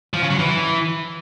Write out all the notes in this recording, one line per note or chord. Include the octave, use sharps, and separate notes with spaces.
F3
C#3
F#3
E3